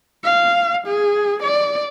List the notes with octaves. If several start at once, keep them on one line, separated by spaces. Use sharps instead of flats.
F5
G#4
D5